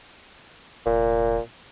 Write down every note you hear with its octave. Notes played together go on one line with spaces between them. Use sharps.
F1 A#2